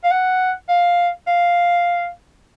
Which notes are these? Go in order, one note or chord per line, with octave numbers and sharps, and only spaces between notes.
F5
F#5
F5
F5